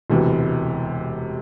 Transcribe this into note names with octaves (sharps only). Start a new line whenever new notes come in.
E1 D2 C3 E3